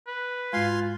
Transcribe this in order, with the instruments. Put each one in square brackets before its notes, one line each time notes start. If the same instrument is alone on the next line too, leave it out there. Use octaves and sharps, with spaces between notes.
[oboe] B4
[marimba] G#2 G#3 [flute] F4 [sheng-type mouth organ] F5 G#5 C6